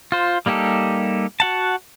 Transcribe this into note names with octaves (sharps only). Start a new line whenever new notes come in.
F4 C5
G3 A#3 D#4 G4 A4
F#4 F#5 A5